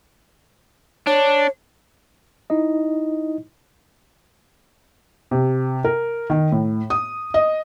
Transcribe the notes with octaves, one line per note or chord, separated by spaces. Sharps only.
D4 C#5
D#4 E4 D#5
C3
A#4
D#3
A2
D#6
D#5